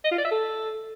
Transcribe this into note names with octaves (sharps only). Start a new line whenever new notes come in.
D#5
F4
D5
E5
A4